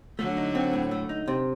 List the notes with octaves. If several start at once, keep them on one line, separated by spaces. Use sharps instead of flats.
D3 F#3 A3
D#4
C4
A2
A3
D#4
C3